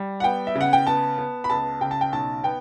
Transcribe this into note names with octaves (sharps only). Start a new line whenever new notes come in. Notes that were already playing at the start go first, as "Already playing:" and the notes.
Already playing: G3
F#5
B3 G5
E5
C#3
F#5
G5
B3 A5
B3
B5
C#2 A5
C#3 G5
A5
G5
B1 A5
B3 G5